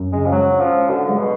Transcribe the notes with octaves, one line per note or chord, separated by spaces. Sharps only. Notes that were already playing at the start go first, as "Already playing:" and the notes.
Already playing: F#2
C#3 G#3
F3
F#3 G#3
C#4
F3
C#5
D3 F#4
G#3
B2